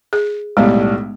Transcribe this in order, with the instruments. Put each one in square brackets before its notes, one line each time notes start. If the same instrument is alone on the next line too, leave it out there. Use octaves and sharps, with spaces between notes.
[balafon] G#4
[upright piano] B1 A2 G3 [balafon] G#3 B3